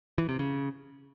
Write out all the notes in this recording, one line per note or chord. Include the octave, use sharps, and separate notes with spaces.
E3
C3
C#3